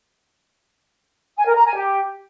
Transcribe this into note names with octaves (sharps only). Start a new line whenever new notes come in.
G#5
A#4
A#5
G#5
G4